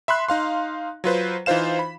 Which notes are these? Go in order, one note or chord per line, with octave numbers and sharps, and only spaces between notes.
E5 B5 C6 F#6
D#4 F5 C6
F#3 F4 B4 C5
E3 D#4 F4 C5 F5 E7
B5